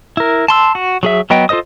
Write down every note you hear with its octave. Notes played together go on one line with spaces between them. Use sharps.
E4 A#4
A5 C6 E6
F#4
F#3 G#4 E5
F#3 B3 D#5 G5
F4 A4 C5 D#5 D#6